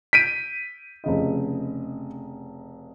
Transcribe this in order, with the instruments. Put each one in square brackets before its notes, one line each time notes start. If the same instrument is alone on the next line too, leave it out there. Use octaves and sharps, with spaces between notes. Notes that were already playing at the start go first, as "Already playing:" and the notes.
[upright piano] G6 [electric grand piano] B6 D7 D#7
[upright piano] F1 C#3 D#5